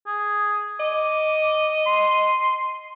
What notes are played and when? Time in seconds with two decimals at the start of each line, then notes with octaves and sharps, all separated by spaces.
0.07 G#4
0.80 D#5 D6
1.87 C6